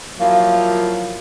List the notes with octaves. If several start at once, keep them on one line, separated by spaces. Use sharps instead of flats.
F3 F#3 A#3 E4 F4